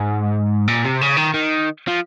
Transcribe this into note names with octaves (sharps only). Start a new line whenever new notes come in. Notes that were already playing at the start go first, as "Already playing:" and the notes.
Already playing: G#2
A#2
C3
C#3
D#3
D#3
F3